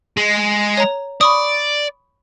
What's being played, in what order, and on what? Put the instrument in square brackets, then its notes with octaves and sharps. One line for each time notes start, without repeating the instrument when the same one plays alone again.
[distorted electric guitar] G#3
[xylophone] C#5 A#5
[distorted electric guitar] D5 [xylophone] B5 C#6 D#6